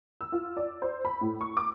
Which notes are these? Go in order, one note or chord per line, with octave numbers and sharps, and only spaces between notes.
E6
F4
D5
C5
B5
A2
C#6
D6